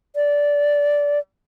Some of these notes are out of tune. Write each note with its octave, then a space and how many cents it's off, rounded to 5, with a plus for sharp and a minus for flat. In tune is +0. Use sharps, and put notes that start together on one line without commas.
D5 -15